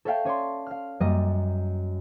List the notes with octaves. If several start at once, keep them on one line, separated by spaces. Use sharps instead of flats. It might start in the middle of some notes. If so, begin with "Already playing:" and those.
A4 C#5 E5 F5 G5 A5
C#4 C#5 D5 C6
F5 F6
F#2 G3 A#3 D#5